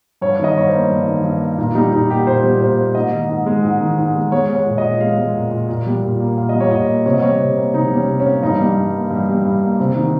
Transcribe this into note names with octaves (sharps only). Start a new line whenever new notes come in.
G2 C#5
D#3 D#5
G2 C#5
C5
A#3
G2
D#3
G2
A#3
A#2 D#4
G3 D#4
A#2 D#4
A#3 G4
A#2 C5
G3
A#2 C5
A#3
G#2 D#5
D#3
G#2
G#3
G#2
D#3
G#2
G#3
G#3 C#5
G#3
C#5
A#2
D#5
A#2
G#3 F5
G#3
A#2
A#2
A#2
G3
A#2
A#3
A#2 F5
D#5
G3
C#5
A#2 D#5
A#3
C3 C#5
D#5
G3 C#5
C3
A#3
C3 D#4
G3
C#4
C3
C#4
A#3
G2 D#4
G3
G2
A#3
G2
G3
G2
A#3
C3
D#3